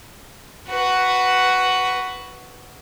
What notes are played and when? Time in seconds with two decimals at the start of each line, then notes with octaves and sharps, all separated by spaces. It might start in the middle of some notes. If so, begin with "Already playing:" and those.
0.68 F#4 B4